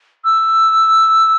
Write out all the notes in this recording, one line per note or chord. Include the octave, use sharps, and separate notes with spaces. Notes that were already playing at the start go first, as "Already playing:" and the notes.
E6